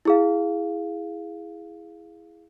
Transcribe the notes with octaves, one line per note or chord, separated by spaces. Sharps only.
E4 G#4 F5